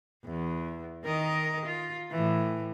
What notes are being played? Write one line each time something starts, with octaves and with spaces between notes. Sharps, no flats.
E2
D#3 A#4 D#5
F4
A2 E3